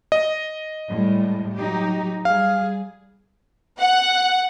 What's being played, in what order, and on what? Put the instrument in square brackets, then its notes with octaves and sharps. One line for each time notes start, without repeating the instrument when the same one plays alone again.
[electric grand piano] D#5
[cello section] A2 G3 G#3
F#3 D#4 G4
[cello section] G3 G#4 [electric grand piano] F5
[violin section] F#5